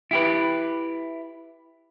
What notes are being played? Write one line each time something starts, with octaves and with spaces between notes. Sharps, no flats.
E4 G4 B4